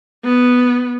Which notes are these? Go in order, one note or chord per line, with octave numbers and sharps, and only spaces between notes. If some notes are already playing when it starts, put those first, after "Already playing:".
B3